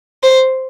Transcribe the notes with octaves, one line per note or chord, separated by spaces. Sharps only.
C5